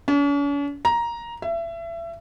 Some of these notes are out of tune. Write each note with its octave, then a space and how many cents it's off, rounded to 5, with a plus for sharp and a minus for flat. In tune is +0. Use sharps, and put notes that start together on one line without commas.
C#4 +45
A#5 +10
E5 +30